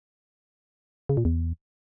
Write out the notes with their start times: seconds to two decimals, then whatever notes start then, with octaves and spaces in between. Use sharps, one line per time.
1.09 C#3
1.17 A#2
1.25 E2